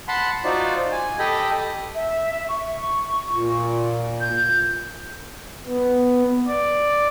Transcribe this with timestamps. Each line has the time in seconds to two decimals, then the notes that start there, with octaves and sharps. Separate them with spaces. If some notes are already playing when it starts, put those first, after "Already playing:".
0.08 F#5 A5 B5 C6
0.45 D#4 F4 F#4 C5 D5
0.92 G#5
1.19 G4 A4 D#5 G5 B5
1.95 E5
2.49 C#6
3.32 A#2
4.21 G6
5.67 B3
6.48 D5